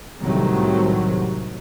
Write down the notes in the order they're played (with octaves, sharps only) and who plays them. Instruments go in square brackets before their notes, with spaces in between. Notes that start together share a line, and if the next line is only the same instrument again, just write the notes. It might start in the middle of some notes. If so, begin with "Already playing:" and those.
[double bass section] C2 A2 C3 D#3 F#3 A3